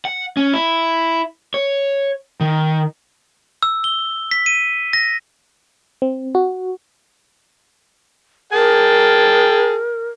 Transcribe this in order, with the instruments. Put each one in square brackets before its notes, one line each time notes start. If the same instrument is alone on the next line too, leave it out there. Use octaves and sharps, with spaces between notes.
[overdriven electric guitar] F#5
C#4
E4
C#5
D#3
[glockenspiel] E6
G7
B6
D#7
A#6
[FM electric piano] C4
F#4
[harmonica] G#4 G5 A5 [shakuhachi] A#4